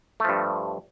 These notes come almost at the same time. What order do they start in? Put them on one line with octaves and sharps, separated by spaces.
A3 F3 G2